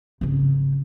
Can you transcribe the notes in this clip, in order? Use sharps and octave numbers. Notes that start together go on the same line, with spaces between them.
G#1 C#3